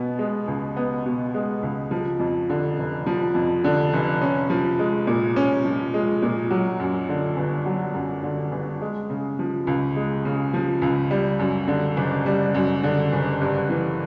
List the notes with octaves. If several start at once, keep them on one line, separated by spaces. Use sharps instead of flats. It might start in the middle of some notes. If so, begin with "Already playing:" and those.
Already playing: B2 B3
G#3
C#2
B3
B2
G#3
C#2
F3
F2
D3
F1
F3
F2
D3
F1
C#4
F3
G#3
A#2
C#4
F3
G#3
A#2
F#3
F#2
D3
G1
F#3
F#2
D3
G1
G#3
C#3
F3
C#2
G#3
C#3
F3
C#2
G3
F#2
D3
F#1
G3
F#2
D3
F#1
G2
E3